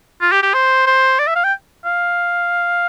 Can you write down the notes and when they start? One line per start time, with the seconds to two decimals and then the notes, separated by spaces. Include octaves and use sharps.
0.21 F4
0.32 G4
0.43 G4
0.54 C5
0.87 C5
1.19 D5
1.27 E5
1.35 F5
1.44 G5
1.85 F5